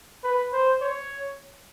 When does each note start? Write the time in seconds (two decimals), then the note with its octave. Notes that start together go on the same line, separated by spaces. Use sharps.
0.24 B4
0.53 C5
0.81 C#5